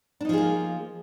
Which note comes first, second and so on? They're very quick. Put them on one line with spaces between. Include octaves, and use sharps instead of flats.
D4 D#4 F3 G#4 A#3